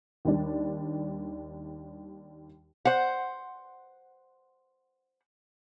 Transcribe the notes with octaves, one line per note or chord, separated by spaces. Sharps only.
D#2 G3 D4
C5 F#5